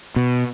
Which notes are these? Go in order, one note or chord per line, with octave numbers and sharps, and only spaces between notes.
B2